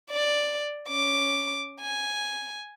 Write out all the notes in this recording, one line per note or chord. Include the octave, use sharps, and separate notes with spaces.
D5
C#4 D6
G#5